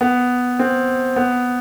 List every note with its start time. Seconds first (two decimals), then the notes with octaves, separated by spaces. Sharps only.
0.01 B3
0.59 C4
1.16 B3